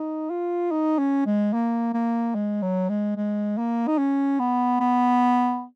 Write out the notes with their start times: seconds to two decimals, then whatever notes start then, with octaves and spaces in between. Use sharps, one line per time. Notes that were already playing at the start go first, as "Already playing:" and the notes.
Already playing: D#4
0.30 F4
0.71 D#4
0.99 C#4
1.26 G#3
1.53 A#3
1.94 A#3
2.35 G#3
2.62 F#3
2.89 G#3
3.17 G#3
3.58 A#3
3.87 D#4
3.98 C#4
4.40 B3
4.80 B3